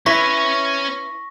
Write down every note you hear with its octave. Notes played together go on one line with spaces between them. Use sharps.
C#4 E4 B4 C#5 C#6 A#6 B6